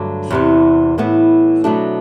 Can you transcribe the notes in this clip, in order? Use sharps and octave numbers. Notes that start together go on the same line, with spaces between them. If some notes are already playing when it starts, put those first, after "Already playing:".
Already playing: G2 D3 F#3 A3
E2 C3 E3
A2 E3 B3
B2 F#3 A3 D4